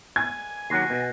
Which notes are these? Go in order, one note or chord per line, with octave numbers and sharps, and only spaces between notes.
G#5 G#6
D#2 F#3 F#6 A#6 C7
B2